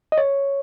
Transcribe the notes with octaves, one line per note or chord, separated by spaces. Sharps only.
D#5
C#5